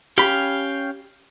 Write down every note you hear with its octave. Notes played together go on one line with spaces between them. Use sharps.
C#4 G4 F5 G5 B5